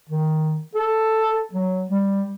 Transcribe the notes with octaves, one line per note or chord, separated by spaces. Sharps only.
D#3
A4
F#3
G3